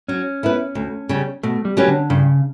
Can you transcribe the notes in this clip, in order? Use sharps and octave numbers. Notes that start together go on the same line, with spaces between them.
F#3 C#4
B3 E4 B4
D2
C#3 G3
B2 A3
G3
F#3 C#4 G4 B4
D3
G2 C#3